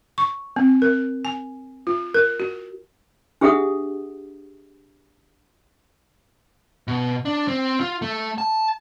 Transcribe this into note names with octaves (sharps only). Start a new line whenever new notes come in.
C#6
C4
A#4
G#5
F4
A#4
F#4
D4 G4 G#4 E5 F#5 D#6
B2
D4
C4
F4
A3
A5